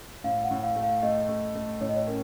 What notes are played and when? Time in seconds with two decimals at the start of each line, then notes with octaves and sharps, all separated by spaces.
0.24 A2 F5
0.44 F#5
0.51 A2
0.63 F5
0.76 A3
0.83 F5
1.03 A3 D#5
1.29 A3
1.55 A3
1.81 A2 C#5
1.89 D#5
1.96 C#5
2.07 C#4 A#4